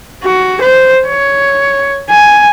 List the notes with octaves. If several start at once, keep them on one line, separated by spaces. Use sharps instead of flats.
F#4
C5
C#5
G#5